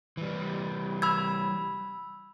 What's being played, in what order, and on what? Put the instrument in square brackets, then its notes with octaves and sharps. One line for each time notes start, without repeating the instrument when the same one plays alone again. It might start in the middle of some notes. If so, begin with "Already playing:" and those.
[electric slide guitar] E3 G3
[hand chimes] B5 E6 G#6